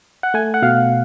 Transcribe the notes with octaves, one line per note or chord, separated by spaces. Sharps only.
F#5
A3 G#5
F#5
B2 F5